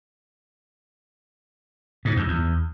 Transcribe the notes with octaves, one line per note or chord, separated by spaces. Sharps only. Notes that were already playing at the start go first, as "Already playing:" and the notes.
G#2
F2
E2